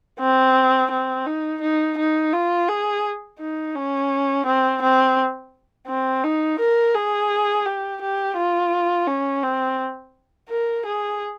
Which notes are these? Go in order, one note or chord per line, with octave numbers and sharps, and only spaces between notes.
C4
C4
D#4
D#4
D#4
F4
G#4
D#4
C#4
C4
C4
C4
D#4
A#4
G#4
G4
G4
F4
C#4
C4
A#4
G#4